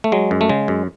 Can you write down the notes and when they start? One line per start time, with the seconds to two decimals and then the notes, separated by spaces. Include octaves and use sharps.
0.04 A3
0.12 F#3 G#3
0.31 F#2
0.41 A3
0.49 C#3 G#3
0.68 F#2